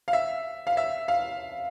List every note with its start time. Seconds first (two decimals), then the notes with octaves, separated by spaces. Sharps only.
0.08 F5
0.13 E5
0.67 F5
0.77 E5
1.08 F5